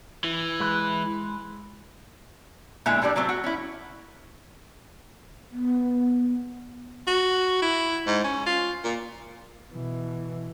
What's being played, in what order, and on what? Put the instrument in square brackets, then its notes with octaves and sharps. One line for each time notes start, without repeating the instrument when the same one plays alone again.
[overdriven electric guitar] E3
[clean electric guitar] G#3 B4
[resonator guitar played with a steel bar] A#2 D3 G#3 E4 E5 A#5
A2 E3 G3 D4
F#3 A3 C4 F4
F#4
C#4 E4
[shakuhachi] B3
[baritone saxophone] F#4
E4
G#2
C#4
F4
A#2
[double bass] B2 E3